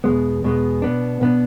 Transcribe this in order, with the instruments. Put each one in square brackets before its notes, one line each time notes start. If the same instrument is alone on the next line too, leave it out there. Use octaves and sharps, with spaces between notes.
[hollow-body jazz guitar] E2 B2 G#3 B3
E2 B2 G#3 B3
B2 B3 D4
B2 B3 D4